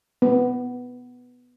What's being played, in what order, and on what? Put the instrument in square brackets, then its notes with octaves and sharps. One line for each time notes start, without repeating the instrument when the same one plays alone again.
[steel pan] B3